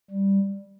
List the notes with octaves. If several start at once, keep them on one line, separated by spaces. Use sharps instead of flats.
G3